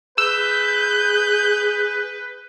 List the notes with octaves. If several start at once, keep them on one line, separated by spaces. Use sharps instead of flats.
G#4 B4 E6 G6